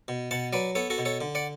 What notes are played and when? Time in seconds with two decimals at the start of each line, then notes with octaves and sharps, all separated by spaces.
0.08 B2
0.31 B2 F#5 A5
0.53 F#3 B4 D5
0.75 B3 A4 C#5
0.90 F#4 A4
0.98 B2
1.05 A4 C#5
1.21 D3
1.35 D5 F#5